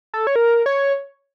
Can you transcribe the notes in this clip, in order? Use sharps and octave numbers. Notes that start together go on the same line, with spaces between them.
A4
C#5
A#4
C#5